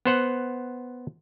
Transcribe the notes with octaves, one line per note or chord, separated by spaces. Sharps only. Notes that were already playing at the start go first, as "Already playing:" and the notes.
B3 C5 F#5